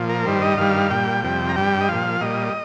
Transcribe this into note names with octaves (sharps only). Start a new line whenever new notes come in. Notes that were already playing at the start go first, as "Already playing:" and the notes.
Already playing: A#2 F3
A#4
G2 D#3 G3 C5
D#5
G2 D#3 G3 F5
A#2 G3 G5
F2 C3 G3
A#5
G2 G3 G5
D#5
A#2 F3 F5
A#2 G3 D#5